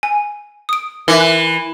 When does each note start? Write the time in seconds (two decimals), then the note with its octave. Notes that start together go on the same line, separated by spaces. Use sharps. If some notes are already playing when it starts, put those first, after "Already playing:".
0.03 G#5
0.69 D#6 D7
1.08 E3 A#4 E5
1.20 F#6